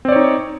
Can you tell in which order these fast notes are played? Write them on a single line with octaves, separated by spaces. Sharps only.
C4 D5 C#5 D#4